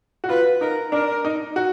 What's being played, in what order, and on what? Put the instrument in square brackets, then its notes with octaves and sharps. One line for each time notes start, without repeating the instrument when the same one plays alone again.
[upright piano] F#4
[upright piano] F4 [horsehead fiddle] B4
[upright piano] D#4 [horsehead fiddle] A#4
[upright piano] D4 [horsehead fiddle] A#4
[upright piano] D#4
F#4